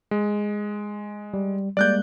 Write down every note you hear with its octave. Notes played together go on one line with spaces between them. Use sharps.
G#3
G3
G3 G#3 A#3 D5 F#6 G6